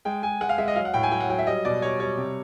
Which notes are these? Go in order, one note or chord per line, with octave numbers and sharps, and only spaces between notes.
G#3 G5
G#3 G#5
G#3 F#5
F5
G#3 E5
D#5
F#3 F5
F#5
A2 G5
G#5
F#3 G5
F#5
F#3 G5
E5
G3 D#5
B2 D5
G3 C#5
G3 C#5
C3